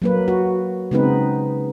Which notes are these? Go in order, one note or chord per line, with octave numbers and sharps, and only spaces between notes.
F#3 A#3 B4
F#4
C#3 G#3 B3 C4 D#4 B4